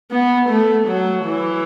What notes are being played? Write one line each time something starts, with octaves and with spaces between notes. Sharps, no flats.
B3
A3
F#3
E3